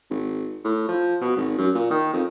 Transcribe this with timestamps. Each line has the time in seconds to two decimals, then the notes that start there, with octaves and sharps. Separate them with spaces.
0.10 G#1
0.64 A2
0.89 F3
1.21 B2
1.36 G#1
1.58 F#2
1.75 A#2
1.91 D#3
2.13 F2